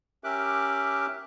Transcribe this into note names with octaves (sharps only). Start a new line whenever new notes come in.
C#4 G4 A#4 E5 D6 F#6